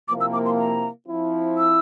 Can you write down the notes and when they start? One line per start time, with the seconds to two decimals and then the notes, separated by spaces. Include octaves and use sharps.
0.08 C3 F3 A#3 E4 D6
0.21 E6
0.33 D6
0.46 C6
0.58 A#5
1.08 F3 C4 E4
1.58 E6